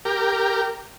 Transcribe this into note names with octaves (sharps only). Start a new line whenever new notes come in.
G4 A#4